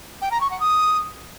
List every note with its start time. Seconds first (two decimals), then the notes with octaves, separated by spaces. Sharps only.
0.22 G5
0.31 A#5
0.41 C#6
0.51 F#5
0.60 D#6